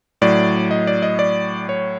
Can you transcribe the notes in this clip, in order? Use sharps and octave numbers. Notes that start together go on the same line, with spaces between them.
A2 F#3 D5
D#5
D5
D#5
D5
C#5